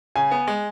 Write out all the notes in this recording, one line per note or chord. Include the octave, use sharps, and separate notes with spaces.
C#3 G#5
B3
G#3